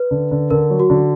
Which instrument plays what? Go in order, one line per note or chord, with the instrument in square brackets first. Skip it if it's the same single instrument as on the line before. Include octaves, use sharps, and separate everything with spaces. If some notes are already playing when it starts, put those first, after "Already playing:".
Already playing: [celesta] B4
[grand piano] D3
D3
[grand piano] D3 [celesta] A#4
[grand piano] F#3
[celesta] F#4
[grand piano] D3